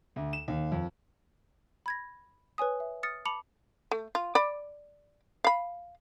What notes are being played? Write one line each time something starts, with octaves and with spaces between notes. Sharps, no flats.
D2
E7
D#2
F2
B5 G#6 A#6
B4 C#5 G#5 D#6
E5
D#6 F6 A6 C#7
A5 B5 D6 C#7 F7 F#7
A3
F4
D5 B5
F5 B5